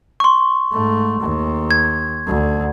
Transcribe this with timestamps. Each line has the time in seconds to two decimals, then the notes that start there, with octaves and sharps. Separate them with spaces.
0.20 C6 C#6
0.73 G#2 A3
1.20 D#2
1.71 G#6
2.27 D2